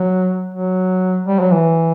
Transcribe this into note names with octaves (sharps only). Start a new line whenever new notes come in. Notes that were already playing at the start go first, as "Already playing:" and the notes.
Already playing: F#3
F#3
G3
F#3
E3